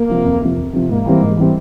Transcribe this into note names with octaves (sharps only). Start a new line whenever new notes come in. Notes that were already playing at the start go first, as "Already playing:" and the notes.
Already playing: A#3
C3 F3
F2
C3 F3
F2
C3 F3
G#2 A#3
E3 G3 C4
G#2
E3 G3 C4